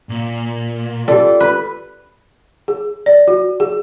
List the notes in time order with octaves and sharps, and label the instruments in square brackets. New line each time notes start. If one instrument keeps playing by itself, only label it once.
[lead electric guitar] A#2
[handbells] F4 G4 [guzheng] A4 [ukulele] D5
[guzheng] B4
[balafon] G#4
D5
F#4
G#4